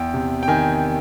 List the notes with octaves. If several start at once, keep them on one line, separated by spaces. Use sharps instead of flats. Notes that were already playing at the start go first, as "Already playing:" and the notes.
Already playing: E2 G5
C3
G5
D#3 G#5